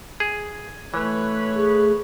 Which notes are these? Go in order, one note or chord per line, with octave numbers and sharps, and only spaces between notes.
G#4
E3 A3 B4 C#5
G#4